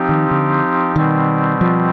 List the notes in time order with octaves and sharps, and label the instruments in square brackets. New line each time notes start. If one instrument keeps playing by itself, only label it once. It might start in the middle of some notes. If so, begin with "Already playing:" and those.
Already playing: [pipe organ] F3 C4 D#4 G4
[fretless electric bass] D#3
D3
[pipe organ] B2 G3 C4 [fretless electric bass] D#3
[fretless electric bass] F3